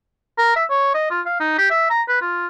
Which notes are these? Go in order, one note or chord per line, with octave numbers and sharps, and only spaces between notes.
A#4
E5
C#5
D#5
F4
F5
D#4
G4
E5
A#5
B4
F4